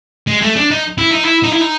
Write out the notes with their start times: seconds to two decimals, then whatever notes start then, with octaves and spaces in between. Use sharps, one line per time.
0.27 G#3
0.41 A3
0.56 D4
0.71 D#4
0.98 E4
1.11 D#4
1.24 E4
1.44 D#4
1.52 E4
1.61 D#4